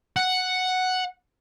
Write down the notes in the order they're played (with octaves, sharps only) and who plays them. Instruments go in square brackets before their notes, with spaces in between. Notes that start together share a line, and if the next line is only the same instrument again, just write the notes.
[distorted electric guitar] F#5